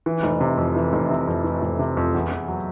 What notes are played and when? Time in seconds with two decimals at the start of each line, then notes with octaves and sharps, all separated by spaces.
0.06 E3
0.23 F1
0.41 C3
0.57 F2
0.76 E3
0.93 F1
1.10 C3
1.27 F2
1.44 E3
1.61 F1
1.79 C3
1.97 F2
2.15 E2
2.31 E2
2.48 F#3